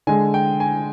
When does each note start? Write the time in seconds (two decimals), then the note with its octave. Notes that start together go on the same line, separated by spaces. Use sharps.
0.07 D3 G#3 G#5
0.34 G5
0.60 G#5